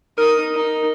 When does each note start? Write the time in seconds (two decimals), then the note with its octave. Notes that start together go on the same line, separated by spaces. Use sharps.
0.18 D#4 A#4 D#6
0.54 D#4